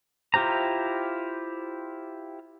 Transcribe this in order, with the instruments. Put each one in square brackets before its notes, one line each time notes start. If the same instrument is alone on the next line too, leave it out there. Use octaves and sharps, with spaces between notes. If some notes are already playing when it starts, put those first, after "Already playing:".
[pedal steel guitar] E4 F4 G4 C5 A#5